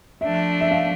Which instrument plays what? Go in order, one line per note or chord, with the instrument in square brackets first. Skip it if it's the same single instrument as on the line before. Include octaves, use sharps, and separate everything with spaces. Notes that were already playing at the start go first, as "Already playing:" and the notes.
[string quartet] F3 A3 D4 [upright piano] E5
[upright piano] E5
F5